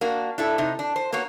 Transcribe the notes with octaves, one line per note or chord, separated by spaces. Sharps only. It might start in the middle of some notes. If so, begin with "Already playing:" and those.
A#3 D4 F#4
D4 E4 A4
C3 D#4
D4
C5
A#3 B3 F#4 C#5